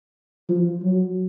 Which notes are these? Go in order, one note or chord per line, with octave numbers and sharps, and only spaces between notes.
F3
F#3